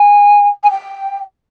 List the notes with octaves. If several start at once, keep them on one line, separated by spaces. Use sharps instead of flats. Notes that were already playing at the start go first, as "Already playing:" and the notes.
Already playing: G#5
G#5
G5